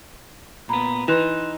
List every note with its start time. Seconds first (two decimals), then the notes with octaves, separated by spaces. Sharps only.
0.69 A#2 B3 A#5 B5
1.08 E3 D#4 C6 F#6 E7